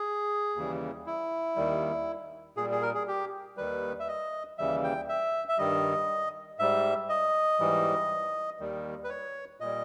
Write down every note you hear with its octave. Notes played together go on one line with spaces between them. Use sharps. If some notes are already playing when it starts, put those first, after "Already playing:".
Already playing: G#4
D#2 C#3 E3 G3
E4
D#2 D#3 G3
A#2 G3 G#4
G#4
A#4
G#4
G4
D#2 D#3 G3 B4
E5
D#5
D#2 C#3 E3 G3 E5
G5
E5
E5
G2 D#3 G3 D#5
G#2 G3 E5
D#5
G#2 E3 G3
D#2 D#3 G3
B4
C#5
A#2 G3 D#5